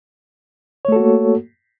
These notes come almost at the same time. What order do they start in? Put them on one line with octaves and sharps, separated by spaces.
C#5 A3 A4 F#4 A#3